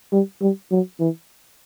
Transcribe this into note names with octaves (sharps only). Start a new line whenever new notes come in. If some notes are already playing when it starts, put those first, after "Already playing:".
G3
G3
F#3
E3